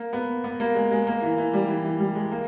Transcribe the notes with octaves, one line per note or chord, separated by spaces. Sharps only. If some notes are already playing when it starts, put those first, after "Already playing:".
Already playing: A#3
B3
B3
A#3
G#3
G#3
A#3
E3
E3
G3
E3
E3
G3
G#3
A#3